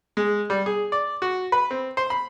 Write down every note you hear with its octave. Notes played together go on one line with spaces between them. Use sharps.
G#3
G3
G#4
D5
F#4
B4
C4
C5
B5